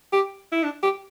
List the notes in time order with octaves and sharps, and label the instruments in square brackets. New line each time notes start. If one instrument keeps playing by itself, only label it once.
[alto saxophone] G4
E4
D4
G4